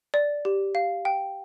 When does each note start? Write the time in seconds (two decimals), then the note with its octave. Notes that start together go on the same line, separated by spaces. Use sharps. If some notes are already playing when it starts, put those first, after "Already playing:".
0.14 D5
0.45 G4
0.75 F5
1.05 G5